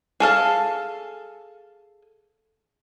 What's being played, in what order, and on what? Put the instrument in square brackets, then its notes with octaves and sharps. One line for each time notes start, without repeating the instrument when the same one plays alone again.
[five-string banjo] G#4 A4 F5 A5